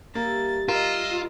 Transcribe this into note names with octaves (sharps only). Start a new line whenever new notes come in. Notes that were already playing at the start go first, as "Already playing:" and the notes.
G2 G3 A#3 E5 A6
F4 A#4 D#5 E6